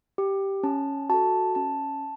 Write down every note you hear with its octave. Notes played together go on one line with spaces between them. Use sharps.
G4
C#4 A5
F#4 A4 A5
C#4 A5